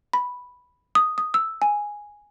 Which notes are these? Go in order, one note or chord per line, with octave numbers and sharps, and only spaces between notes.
B5
D#6
D#6
E6
G#5